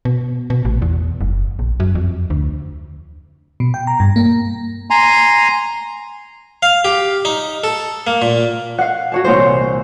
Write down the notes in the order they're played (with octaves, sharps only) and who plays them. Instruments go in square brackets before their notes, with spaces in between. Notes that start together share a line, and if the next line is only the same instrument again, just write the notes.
[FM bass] B2
B2
A1
E2
F#1
A#1
F#2
F2
D2
[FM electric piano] B2
G5
A#5
G2
A#3
[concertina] G#5 A#5 C6
[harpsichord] F5
G4
D#4
A4
A#3
A#2
[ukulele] F5 F#5
F#4 C#5 A5
[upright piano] C2 A#2 E3 [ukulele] C5 C#5